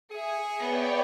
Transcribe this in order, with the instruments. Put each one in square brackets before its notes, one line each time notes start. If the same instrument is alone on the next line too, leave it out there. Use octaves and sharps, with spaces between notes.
[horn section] G#4 [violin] E5 C#7
[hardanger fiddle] B3 [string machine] C#5 D5 G5